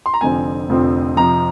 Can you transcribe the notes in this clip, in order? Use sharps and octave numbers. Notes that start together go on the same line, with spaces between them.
C6
A#5
F1 F2 D3 F3 C4 G#5
F1 F2 D3 F3 C4
F2 C3 F3 A#5